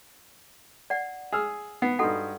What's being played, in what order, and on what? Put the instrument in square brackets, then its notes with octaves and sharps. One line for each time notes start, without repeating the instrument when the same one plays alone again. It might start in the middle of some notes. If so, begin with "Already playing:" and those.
[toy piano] D5 F#5
[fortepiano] G#4 E6 F6
[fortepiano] B3 [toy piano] F#5
[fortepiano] G2 D#4 [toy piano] F#4 A4 F#5